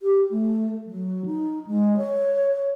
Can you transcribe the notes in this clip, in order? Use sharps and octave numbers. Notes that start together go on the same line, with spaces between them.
G4
A3
F#3
D#4
G#3
C#5